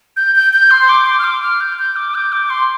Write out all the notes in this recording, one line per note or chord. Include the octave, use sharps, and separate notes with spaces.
G6
G6
G6
C6
D6
C6
F6
D6
F6
G6
G6
D6
G6
D6
C6